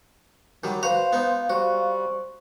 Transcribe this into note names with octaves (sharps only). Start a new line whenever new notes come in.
D#3 F#3 G3
F#4 B4 C5 F5
B3 D#4
G3 F#4 C5 C#6